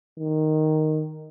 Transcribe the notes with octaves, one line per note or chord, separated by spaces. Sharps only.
D#3